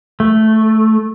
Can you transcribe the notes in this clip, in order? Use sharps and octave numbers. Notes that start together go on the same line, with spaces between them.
A3